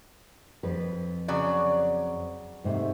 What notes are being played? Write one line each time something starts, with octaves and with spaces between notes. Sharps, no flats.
F2 B4
C#3 F#3 D5
G#2 C3 A3